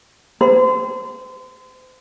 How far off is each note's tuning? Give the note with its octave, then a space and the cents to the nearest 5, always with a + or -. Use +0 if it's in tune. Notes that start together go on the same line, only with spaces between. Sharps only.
C5 -35